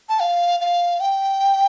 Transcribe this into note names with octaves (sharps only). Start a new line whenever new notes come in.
A5
F5
F5
G5